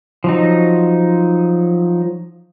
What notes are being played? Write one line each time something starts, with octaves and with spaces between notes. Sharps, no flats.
F3 F#3 D#4